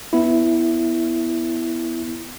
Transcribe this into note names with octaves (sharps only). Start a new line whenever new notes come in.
B3 E4